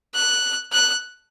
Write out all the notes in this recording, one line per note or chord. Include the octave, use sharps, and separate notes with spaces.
F#6
F#6